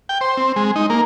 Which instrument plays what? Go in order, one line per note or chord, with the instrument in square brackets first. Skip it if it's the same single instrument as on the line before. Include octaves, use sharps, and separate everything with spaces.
[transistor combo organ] G5
C5
C4
G#3
D#4
A#3